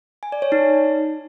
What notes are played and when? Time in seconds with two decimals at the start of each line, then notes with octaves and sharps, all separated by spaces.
0.23 G#5
0.32 D5
0.42 C#5
0.52 D#4